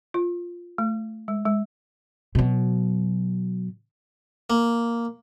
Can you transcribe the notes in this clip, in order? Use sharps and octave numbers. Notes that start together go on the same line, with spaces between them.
F4
A3
G#3
G#3
B2 F#3
A#3